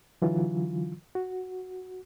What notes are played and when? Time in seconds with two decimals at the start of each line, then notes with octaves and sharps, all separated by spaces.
0.22 D3 E3 F#3 F4
1.15 F#4